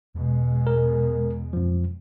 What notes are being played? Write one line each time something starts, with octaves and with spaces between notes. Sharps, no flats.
E2 B2 G#3
A#4
F2 F3